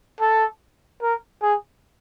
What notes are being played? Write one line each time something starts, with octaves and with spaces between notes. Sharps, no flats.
A4
A#4
G#4